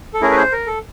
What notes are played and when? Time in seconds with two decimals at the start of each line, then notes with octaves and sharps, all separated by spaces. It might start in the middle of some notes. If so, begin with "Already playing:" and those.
0.14 A4
0.21 A3 C#4 E4 G#4 A#4
0.31 B4
0.37 C5
0.52 A#4
0.67 A4